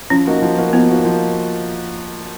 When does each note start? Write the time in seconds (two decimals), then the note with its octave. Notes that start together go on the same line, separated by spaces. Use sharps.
0.10 F3 C#4
0.27 A#3 D#4 F#4
0.42 F3
0.58 A#3 D#4 F#4
0.73 F3 B3
0.89 A#3 D#4 F#4
1.05 F3